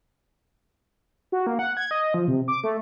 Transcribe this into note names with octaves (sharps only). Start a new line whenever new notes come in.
F#4
A#3
F#5
G#6
D#5
F3
C3
D6
A3